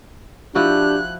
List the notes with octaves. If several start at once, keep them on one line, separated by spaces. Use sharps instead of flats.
F3 D4 E4 F#4 G4 F#6